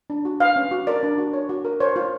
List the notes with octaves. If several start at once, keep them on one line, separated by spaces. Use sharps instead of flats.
D4
F#4
B4 F5
C#4
F#4
A#4 D5
D4
F#4
C#5
F#4
A#4
C5 C#5
F4